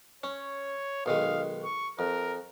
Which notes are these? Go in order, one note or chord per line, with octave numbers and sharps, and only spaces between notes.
C#4 C#5
B1 D#3 G#3 F5
C#6
F2 A#4